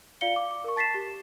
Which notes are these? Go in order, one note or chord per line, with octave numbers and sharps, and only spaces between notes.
F4 D5 F5 C#7 G7
D6
D6
A#4 C#6
A5 A6 B6 C7 E7
G4